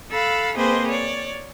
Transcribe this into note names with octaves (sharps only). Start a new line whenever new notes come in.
A4 F5 B5 E6 F#6
A#3 C4 G#4 B4 C5 D#5
C#5 D5